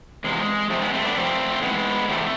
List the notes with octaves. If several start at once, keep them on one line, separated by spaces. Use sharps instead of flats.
E2 C3 F3 G#3
F2 C3 F3 A3
G#3 B3
A3 C4
B3 D4
F2 C3 F3 A3 C4
G#2 E3 G#3 B3
E2 C3 E3 A3